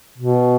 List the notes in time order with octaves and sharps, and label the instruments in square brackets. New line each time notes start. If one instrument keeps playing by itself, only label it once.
[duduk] B2